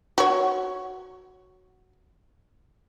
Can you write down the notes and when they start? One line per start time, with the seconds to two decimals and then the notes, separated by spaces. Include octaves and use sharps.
0.18 F#4 C#5